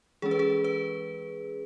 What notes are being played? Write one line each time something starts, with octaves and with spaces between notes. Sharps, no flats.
E3 G#3 C#4 G#4
B4
G#4
B4